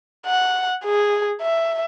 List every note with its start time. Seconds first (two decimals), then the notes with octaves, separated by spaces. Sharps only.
0.26 F#5
0.84 G#4
1.42 E5